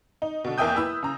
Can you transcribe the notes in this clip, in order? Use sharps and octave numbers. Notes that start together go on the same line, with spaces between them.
D#4
B2 D3
E2 A#3 E5 G5 D#6 G6
E4 B4 E6
C#3 A#5